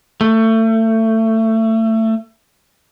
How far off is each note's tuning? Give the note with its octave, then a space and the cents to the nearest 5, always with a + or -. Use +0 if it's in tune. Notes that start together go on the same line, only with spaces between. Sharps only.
A3 +25